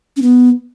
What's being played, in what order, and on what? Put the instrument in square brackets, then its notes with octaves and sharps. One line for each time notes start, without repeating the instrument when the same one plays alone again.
[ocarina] C#4
B3